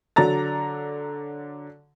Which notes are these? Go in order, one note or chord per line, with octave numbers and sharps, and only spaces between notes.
D3 F#3 D5 A#5 A6